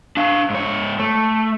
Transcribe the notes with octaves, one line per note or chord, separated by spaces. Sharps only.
D4 F5
G#2 C#5
A3